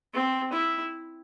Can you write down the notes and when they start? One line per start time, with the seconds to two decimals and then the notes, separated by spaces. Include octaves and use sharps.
0.14 C4
0.53 E4